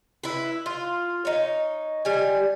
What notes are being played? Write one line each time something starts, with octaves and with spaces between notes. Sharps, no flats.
E4 B4
F4
D#4 C#5
G3 G#5